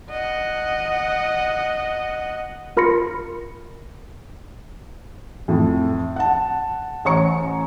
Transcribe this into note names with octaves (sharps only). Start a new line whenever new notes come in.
D#5 F#5
F4 A#4 B5 C6 A#6 C#7
F2 A2
F#5 A5
A1 C5 C#5 A#5 C#6 C#7